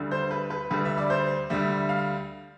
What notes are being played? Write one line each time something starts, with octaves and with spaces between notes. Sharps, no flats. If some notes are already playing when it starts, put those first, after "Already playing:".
Already playing: D2 D3 G3
C5
B4
B4
D2 D3 G3 B4
E5
D5
C5
D2 D3 G3 E5
F5